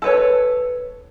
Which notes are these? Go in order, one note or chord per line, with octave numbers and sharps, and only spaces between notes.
A4 B4 C#5